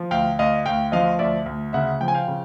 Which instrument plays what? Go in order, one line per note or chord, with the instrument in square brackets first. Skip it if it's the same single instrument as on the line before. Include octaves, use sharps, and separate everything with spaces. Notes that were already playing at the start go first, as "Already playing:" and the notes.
Already playing: [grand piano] F3
D2 F5 G5
D2 D#5 F5
D2 F5 G5
F3 D#5 F5
D2 D5 E5
D2
C#3 E5 F#5
F3 G5
G#5
F5 G5
C#3